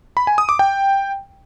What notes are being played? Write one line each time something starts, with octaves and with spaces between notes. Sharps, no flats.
B5
G#5
D#6
D6
G5